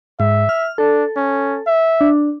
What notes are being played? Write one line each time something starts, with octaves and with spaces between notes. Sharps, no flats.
G#2 E5
F6
D4 A4
C#4
E5
D4